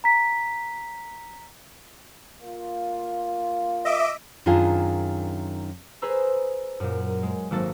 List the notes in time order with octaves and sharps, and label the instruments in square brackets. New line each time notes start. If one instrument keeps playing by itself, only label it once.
[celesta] A#5 B6
[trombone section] A#3 F4
[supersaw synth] D#5 E5 D6
[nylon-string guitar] F#2 D#3 D4 F4 G#4
[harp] G#4 B4 C5 A#5 E6
F#2 A#2
G#3
G#1 F#3 A#3 F#4 A4 A6